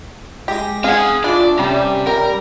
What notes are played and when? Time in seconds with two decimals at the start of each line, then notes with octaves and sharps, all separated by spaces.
0.48 G#3 G4 G#4 A#6
0.84 C4 G#4 F5 F#5 G#5
1.24 E3 A3 D4 F4 D5
1.59 C3 G3 C#4
2.07 A#4 G5 A#5